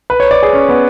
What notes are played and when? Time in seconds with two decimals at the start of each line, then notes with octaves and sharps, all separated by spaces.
0.10 B4
0.20 C#5
0.31 D5
0.43 G#4
0.53 C#4
0.69 B3